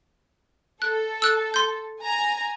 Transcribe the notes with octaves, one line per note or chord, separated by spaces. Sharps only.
A4 F#6
E6 F#6
C6 G6
G#5 A#5